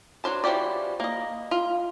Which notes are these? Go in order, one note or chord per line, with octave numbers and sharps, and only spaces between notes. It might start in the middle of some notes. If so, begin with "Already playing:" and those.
F#3 D4 C5 A5
E3 F3 F#4 G4 D5
A#3 D#5
F4